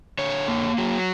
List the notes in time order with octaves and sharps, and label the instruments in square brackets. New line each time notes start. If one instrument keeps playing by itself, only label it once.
[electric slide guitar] D3 C#5
A#3
F#3